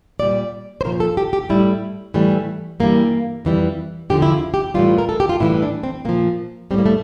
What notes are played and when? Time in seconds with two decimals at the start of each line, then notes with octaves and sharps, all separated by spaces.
0.20 A#2 G3 D5
0.81 C5
0.85 A#2 F3 A#4
1.00 A4
1.17 G4
1.33 G4
1.49 A2 G3 E4
2.14 A2 E3 G3 A3
2.80 G2 E3 G3 A#3
3.45 F2 E3 G3
4.10 E2 D3 F3 G4
4.22 E4
4.32 F4
4.54 G4
4.74 A2 E3 G3 F4
4.98 A#4
5.09 A4
5.20 G4
5.29 F4
5.40 A2 E3 G3 E4
5.62 D4
5.83 C4
6.05 A#2 F3 A#3
6.71 G3 C4
6.74 A2 A#3
6.86 A3